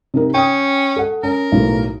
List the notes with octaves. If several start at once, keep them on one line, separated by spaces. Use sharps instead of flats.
C3 D#4 A#4
C#4 G5 D#6
A4 F#5
C#4 A#4
B1 A2